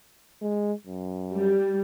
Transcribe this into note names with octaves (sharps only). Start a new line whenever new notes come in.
G#3
F#2
G3